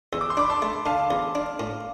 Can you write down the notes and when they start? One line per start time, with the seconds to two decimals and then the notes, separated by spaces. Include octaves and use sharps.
0.12 E2 E6
0.21 D6
0.30 C6
0.37 D4 B5 D6
0.49 A5 C6
0.62 A3
0.86 D3 F5 A5
1.11 E2
1.35 D4
1.60 A2